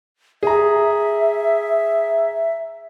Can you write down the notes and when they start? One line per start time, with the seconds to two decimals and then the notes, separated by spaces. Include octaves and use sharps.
0.43 G#4 E5 A#5